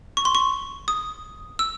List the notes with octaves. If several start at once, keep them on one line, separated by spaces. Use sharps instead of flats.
C#6
C6
C#6
D#6
E6